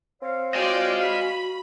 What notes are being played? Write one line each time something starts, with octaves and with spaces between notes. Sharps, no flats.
C4 C#5 F5
F4 F#4 D5 D#5 G5 G#5
B5